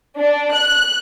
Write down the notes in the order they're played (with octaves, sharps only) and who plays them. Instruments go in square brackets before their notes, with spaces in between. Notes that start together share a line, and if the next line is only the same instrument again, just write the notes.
[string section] D4
F#6